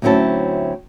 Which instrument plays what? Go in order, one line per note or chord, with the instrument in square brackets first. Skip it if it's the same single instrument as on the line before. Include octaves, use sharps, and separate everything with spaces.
[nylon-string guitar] D2 F#3 C4 C#4 E4 A5